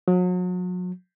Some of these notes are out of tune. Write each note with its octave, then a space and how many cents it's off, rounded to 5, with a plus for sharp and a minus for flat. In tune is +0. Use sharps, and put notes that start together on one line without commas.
F#3 -35